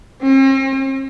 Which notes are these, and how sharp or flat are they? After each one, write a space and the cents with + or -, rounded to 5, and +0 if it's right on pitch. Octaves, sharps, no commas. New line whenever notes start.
C4 +45